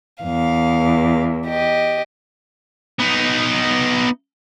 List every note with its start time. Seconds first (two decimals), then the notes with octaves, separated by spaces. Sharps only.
0.24 E2 F5
1.48 G4 D#5
3.00 B3 D#4